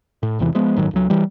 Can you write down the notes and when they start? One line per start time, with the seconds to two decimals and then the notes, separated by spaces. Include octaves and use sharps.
0.23 A2
0.39 G#1 E2 C3 E3
0.55 F3 G#3 B3
0.76 G1 G#2 D#3 F#3
0.93 C#2 F#3
1.10 E3 G3